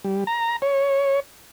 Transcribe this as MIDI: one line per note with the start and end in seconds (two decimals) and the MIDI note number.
0.04 0.24 55
0.27 0.56 82
0.62 1.20 73